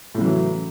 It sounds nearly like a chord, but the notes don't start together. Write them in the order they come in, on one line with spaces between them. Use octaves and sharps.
A2 C#3 F#3 E3